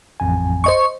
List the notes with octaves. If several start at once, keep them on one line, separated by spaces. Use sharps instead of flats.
A1 F2 G#5
C5 D#5 C#6